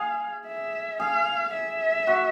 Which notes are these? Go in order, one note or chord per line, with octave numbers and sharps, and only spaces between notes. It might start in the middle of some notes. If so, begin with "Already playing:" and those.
Already playing: G#4 F5
E5
G#4 F5
E5
F#4